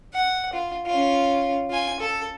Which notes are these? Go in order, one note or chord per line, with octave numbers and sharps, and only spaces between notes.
F#5
F4
C#4 F4
F4 G#5
A4